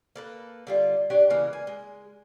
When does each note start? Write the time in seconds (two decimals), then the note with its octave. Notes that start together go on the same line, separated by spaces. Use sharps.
0.16 A#3 A4 B4
0.67 D3 G3 F4
1.10 D4 G4 C#5
1.30 C#3 E3 G#3 A#3
1.53 G#5
1.67 G#3